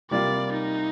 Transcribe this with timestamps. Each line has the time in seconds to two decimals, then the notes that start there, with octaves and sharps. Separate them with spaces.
0.11 C3 G3 A#3 F4 D5
0.53 D#4